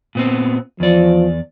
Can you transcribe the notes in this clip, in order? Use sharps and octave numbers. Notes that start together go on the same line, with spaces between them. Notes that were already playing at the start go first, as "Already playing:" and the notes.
A#2 B3 C4
E2 F3 D5